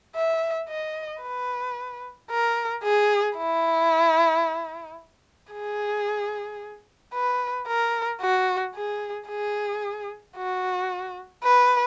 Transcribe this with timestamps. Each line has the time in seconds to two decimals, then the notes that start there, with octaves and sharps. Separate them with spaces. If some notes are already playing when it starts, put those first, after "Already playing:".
0.16 E5
0.69 D#5
1.23 B4
2.31 A#4
2.84 G#4
3.37 E4
5.53 G#4
7.13 B4
7.67 A#4
8.21 F#4
8.75 G#4
9.28 G#4
10.36 F#4
11.43 B4